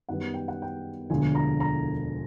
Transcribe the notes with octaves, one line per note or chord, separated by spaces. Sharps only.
F#2 D#3 G3 B3 F#5
G5
F#5
G5
E1 D2 D3 F3 G#5
A#5
A#5